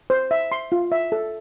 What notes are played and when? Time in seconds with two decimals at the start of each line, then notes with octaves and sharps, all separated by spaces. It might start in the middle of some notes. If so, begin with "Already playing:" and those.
0.10 C5
0.31 E5
0.52 C6
0.72 F4
0.92 E5
1.12 A4